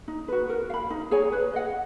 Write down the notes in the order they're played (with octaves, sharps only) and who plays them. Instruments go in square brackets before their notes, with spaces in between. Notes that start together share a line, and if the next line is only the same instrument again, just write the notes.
[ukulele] D#4
F#4 B4
A#4
F5
B5
D#4
G#4 C#5 G#5
B4
D#5 F#5